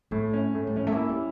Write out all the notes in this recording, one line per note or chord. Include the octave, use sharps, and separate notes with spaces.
A2 A3
C#4
A2
G3
F3 C#4
A3
A#3 E4
G3